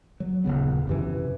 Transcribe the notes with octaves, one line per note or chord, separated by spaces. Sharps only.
F#3
D#1 F#2 C#3 B3
F#2 C3 E3